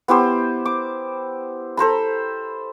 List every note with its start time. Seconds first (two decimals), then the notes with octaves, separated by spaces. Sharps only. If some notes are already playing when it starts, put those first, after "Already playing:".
0.08 B3 E4 G4 C5
0.66 D6
1.77 A4 C5 A#5 B5